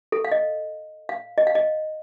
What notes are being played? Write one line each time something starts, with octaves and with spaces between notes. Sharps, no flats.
A4
F5
D#5
F5
D#5
F5
D#5